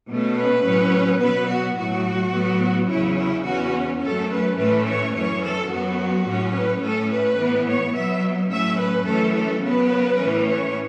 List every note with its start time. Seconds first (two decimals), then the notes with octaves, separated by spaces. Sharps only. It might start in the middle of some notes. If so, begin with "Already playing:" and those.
0.10 B2 A3 C#4
0.37 B4
0.65 A2 F#3 C#4
1.21 B2 F#3 B3 B4
1.49 F#4
1.78 A2 F#3 A3 F#4
2.33 A2 F#3 B3
2.90 E2 C#3 F#3 C#4 E4
3.18 E4
3.45 E2 E3 C#4 F#4
4.02 F#2 F#3 A3 C#4 A4
4.30 B4
4.57 A2 E3 A3 C#4 B4
4.86 C#5
5.13 F#2 E3 C#4 C#5
5.42 A4
5.71 F#2 F#3 B3 F#4
6.26 A2 F#3 C#4
6.54 B4
6.82 A2 A3 C#4 A4
7.10 B4
7.38 A2 E3 B3
7.67 C#5
7.94 B2 F#3 B3 E5
8.50 A2 F#3 A3 C#4 E5
8.79 B4
9.06 F#2 E3 A3 C#4 A4
9.34 A4
9.62 C#3 F#3 B3 B4
10.18 A2 E3 A3 C#4
10.46 C#5